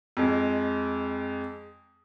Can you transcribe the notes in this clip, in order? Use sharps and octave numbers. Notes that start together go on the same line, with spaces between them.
F2 G#3